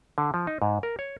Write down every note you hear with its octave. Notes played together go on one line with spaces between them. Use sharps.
D3
F3
D#4
G#2
A#4
C#5